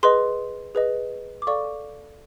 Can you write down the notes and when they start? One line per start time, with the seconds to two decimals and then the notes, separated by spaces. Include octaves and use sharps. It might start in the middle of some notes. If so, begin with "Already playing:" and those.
0.03 G#4 B4 D#5 C6
0.75 G#4 B4 D#5
1.42 D6
1.47 A4 D5 F5 C#6